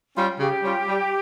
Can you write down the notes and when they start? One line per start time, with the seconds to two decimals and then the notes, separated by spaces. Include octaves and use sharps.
0.15 G3 C#4 F4
0.39 C#3 G4
0.64 G3 C#4 F4
0.88 G3